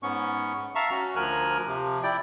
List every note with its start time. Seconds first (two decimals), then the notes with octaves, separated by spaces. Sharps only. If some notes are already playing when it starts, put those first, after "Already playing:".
0.03 G#2 B3 C#4 C#6
0.75 E5 F5 A5 A#5 C#6
0.91 C#4 F#4
1.16 D2 F3 A#4 G#5 F6 F#6
1.67 C3 F3
2.03 E4 D5 G5